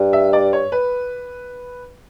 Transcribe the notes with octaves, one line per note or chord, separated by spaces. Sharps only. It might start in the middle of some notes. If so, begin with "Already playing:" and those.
Already playing: G2
E5
D5
C#5
B4